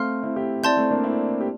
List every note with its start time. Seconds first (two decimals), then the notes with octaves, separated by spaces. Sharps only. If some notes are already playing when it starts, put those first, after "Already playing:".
Already playing: A3 C4 F5 C6 F6
0.23 C4 E4
0.36 E4 G4
0.63 C4 E4 D5 A5 C6 G6
0.77 A3 C4
0.91 A#3 D4
1.04 C4 E4
1.41 G4